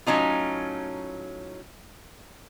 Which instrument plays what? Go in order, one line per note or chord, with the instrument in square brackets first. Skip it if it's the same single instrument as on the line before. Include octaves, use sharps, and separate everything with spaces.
[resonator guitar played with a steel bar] A2 F#3 C#4 D#4 F4